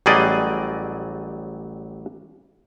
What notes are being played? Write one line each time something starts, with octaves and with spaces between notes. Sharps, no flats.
A1 F#3 G3 G#4 D5 D#5